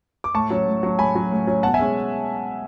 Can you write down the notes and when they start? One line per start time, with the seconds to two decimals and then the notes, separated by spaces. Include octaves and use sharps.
0.24 D6
0.35 A2 A5 C#6
0.50 F#3 C#4
0.67 A2
0.83 F#3 C#4
0.99 A2 G#5 B5
1.15 F#3 C#4
1.31 A2
1.47 F#3 C#4
1.63 B2 F#5 A5
1.74 E5 G#5
1.79 G#3 C#4